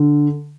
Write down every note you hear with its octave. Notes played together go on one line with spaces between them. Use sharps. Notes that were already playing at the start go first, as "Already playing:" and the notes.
Already playing: D3